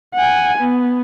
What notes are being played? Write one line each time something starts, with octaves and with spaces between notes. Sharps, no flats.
F#5 G#5
B3